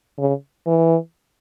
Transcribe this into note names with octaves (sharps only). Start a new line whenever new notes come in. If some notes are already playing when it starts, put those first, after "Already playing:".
C#3
E3